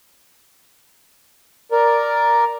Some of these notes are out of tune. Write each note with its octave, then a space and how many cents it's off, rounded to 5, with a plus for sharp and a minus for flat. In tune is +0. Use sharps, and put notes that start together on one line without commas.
A#4 +5 D5 +0